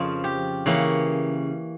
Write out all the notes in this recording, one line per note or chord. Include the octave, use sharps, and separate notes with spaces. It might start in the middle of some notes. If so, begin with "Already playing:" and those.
Already playing: F2 C#3 F3 F4 A#4
G4
C#3 E3 A#3 C#4